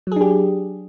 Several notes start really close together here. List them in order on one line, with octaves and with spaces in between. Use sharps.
F#3 G#4 D4 G4